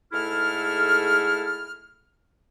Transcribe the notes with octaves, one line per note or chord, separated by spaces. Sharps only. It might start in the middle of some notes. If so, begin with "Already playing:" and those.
G#2 A3 E4 G#4 A4 F6